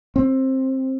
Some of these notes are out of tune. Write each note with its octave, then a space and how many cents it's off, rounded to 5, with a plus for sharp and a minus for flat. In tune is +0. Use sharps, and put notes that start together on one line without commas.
C4 +15